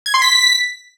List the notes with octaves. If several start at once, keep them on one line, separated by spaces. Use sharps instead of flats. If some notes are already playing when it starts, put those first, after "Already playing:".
G#6
C6
B6